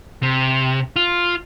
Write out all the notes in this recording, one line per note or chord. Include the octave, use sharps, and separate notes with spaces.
C3
F4